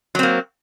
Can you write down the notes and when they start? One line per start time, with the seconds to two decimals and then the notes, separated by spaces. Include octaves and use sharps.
0.15 F#3
0.19 C4
0.23 A#3